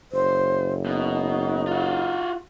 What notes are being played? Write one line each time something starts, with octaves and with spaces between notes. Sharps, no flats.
F#1 C5
B2 D#4
F4 F#4